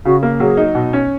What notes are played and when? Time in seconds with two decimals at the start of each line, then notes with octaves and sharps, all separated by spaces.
0.05 C#3 F#4
0.23 A#3
0.40 F#3 G#4
0.57 D#4
0.75 B2
0.93 C#4